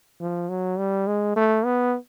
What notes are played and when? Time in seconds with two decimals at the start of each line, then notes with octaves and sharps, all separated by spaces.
0.20 F3
0.49 F#3
0.79 G3
1.07 G#3
1.36 A3
1.65 B3